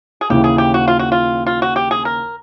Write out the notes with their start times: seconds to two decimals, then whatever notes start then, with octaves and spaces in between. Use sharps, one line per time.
0.21 G#4
0.30 D#2 C#3 E3 G4
0.44 G#4
0.58 G4
0.74 F#4
0.88 F4
0.99 F#4
1.12 F4
1.47 F4
1.62 F#4
1.76 G4
1.91 G#4
2.05 A#4